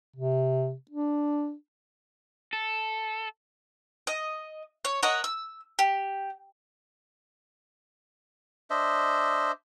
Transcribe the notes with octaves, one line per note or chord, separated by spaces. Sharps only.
C3
D4
A4
D#5
C#5
A#4 C#5 D#5 F#5
E6
G4
D4 C5 D#5 E5